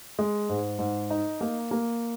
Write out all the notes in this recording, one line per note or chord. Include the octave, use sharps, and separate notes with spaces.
G#3
G#2
G#2
D#4
A#3
A#3